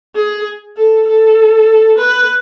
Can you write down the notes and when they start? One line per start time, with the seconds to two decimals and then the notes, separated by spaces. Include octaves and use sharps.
0.16 G#4
0.77 A4
1.08 A4
1.98 B4